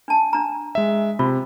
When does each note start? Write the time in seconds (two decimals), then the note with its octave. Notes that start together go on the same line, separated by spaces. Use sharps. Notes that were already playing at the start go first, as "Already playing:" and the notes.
0.08 D4 A5
0.33 D4 A#5
0.75 G#3 E5
1.19 C3 F4